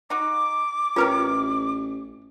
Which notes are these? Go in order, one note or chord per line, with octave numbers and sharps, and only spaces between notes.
D#4 F#4 D6
A1 C3 F4 A#4 B4 C#5